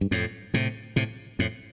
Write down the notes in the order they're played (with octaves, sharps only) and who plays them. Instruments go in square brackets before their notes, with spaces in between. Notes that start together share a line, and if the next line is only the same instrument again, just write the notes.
[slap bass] G2
F2 A2
A2 C3
A2 C3
F2 A2